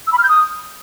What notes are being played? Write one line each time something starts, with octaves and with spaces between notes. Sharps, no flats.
E6
B5
F6
G6
D#6